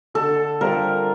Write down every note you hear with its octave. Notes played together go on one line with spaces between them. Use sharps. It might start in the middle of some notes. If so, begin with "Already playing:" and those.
D3 A4
G3 C4 F4 A#4